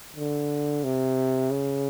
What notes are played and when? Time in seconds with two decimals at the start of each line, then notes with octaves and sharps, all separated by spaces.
0.16 D3
0.84 C3
1.51 C#3